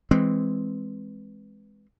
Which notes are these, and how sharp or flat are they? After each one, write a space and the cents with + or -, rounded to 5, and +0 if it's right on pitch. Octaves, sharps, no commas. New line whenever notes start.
E3 +0 G#3 +0 C4 +0